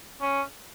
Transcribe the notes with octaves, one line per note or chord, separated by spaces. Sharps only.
C#4